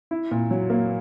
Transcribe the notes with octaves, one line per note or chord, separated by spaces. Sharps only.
E4
A#2
F#3
A#3